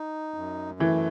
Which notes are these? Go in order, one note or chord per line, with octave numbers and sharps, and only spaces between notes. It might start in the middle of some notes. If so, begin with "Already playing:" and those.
Already playing: D#4
F#2
E3 A3